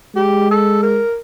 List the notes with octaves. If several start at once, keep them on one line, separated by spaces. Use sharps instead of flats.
G#3 G4
A4
A#4